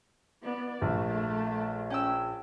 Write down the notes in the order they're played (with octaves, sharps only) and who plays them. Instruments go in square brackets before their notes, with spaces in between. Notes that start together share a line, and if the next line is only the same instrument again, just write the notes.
[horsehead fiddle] B3 D5
[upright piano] A#1 [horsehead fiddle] A3
[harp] C#4 G5 E6